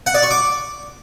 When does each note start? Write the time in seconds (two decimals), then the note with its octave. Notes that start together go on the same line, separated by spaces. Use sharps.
0.07 F#5
0.15 D5
0.23 C#6
0.31 D6